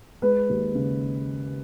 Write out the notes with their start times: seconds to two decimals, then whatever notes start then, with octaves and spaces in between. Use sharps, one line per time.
0.22 G#3 B4
0.49 D#2
0.75 C#3